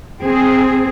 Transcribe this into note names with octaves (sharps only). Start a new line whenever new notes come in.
C4 G#4